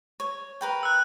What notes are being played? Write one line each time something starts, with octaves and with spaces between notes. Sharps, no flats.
C#5
A#4 B4 G5
E6 F#6